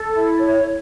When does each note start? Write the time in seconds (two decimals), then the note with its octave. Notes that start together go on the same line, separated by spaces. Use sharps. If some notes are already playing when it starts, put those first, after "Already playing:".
Already playing: A4
0.12 E4
0.39 C#5